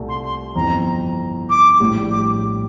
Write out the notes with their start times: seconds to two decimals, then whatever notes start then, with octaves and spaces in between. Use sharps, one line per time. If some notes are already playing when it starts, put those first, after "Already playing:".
Already playing: C2 A#2 A3
0.08 C6
0.24 C6
0.56 G1 F2 E3 A#5
1.49 D6
1.80 A#1 A2 G3
2.11 D6